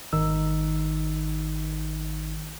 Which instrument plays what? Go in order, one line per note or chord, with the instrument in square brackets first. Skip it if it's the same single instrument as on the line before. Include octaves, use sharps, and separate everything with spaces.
[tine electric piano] G#1 D#3 D#4 E6